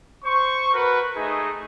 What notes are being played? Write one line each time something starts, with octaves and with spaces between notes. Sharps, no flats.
C5 C#6
F#4 A#4 B4
A3 D#4 G#4